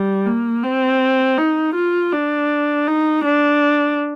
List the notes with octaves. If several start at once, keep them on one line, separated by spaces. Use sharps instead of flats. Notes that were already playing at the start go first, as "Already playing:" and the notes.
Already playing: G3
A#3
C4
D#4
F4
D4
D#4
D4